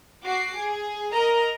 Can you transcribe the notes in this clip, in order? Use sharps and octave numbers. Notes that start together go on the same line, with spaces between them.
F#4 D6 C7
G#4
A#4 D#5 A#5